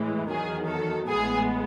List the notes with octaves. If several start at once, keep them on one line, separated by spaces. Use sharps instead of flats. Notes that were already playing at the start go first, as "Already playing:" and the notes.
Already playing: A2 E3 G#3
E2 D#3 F#3 G#4
A4
A1 A2 G#3 B3 G#4